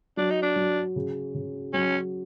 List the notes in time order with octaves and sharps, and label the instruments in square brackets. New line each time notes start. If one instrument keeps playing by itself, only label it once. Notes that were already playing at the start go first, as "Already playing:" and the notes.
[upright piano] F#3 [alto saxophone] D4
[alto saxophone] D#4
D4
[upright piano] F#3
C#3
C#3
[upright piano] F#3 [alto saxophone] C#4